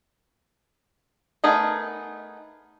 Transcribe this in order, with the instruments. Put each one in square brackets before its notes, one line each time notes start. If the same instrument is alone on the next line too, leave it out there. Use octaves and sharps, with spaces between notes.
[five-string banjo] A3 B3 D#4 G#4 A#4